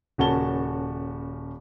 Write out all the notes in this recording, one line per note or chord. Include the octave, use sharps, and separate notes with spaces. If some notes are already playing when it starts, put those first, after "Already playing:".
D#1 C#3 F#4 A#4 A5 G7